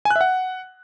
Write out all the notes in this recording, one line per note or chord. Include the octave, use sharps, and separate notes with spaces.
G#5
F#6
E5
F#5